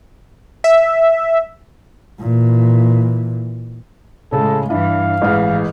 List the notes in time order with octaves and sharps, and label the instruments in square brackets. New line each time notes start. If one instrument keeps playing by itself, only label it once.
[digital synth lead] E5
[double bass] A#2 E3
[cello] A2 G#3 [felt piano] C#3 G#4 [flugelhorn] A4
[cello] G2 E3 [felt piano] D4 E4 [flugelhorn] F5
[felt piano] A1 G#2 F6 [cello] E3 G#4